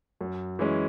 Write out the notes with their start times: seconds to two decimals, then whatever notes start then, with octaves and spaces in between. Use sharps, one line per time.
0.21 F#2
0.59 E3 G#3 C#4